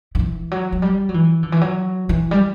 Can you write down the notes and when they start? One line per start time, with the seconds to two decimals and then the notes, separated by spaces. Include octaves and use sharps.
0.15 D3
0.19 E3
0.51 F#3
0.72 F#3
0.82 G3
1.09 F#3
1.14 E3
1.43 D3
1.52 E3
1.61 F#3
2.09 E3
2.31 G3